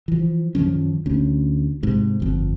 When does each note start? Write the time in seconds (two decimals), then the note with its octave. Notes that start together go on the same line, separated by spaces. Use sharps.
0.08 E3 F3
0.55 F#2 D#3 F3 C#4
1.06 D2 C#4
1.83 G#2 C3
2.20 G1 F2